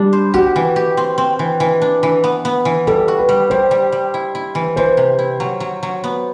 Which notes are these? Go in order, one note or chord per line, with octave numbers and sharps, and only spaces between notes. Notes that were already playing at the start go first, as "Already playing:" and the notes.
Already playing: G3 D4
C5
F#4 G4
E3
G4
C4
C4
E3
E3
D4
E3
B3
B3
E3
G3 A4
F#4
B4
G3
G3 C5
G3
G3
E4
E4
E3
E3 C5
C3
E4
F#3
F#3
F#3
B3